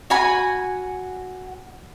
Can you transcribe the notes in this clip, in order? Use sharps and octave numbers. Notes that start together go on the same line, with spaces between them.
F#4 F#5 G#5 B5